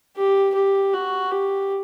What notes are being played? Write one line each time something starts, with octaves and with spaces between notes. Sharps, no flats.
G4
G4
F#4
G4